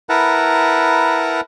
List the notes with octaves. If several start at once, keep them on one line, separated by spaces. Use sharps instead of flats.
E4 A#4 B4 F#5 A5 A#5